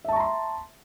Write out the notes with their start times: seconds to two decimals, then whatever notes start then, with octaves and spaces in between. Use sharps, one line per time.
0.04 E5
0.08 A5
0.12 C#6
0.16 A#5
0.20 C6